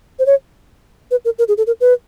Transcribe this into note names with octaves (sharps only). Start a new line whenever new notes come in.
C5
C#5
B4
A#4
A#4
G#4
A4
A#4
B4